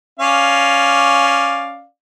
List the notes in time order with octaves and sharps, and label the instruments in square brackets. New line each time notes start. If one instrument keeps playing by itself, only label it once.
[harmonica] C#4 D5 F5